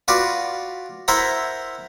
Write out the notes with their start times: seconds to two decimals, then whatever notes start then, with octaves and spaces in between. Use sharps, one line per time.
0.08 F4 F#4 B4 D5
1.08 E4 A#4 C5 E5 F#5 A#5